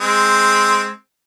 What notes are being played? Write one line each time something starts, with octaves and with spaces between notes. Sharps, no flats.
G#3 C4